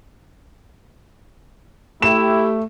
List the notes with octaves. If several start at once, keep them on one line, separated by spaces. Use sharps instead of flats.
A3 E4 G4 E7